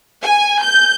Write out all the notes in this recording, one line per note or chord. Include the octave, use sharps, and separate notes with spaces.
G#5
G6